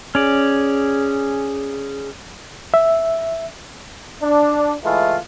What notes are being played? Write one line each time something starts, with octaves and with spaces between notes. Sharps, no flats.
C#4 G#4 D5
E5
D4
E3 G#3 A3 E4 F4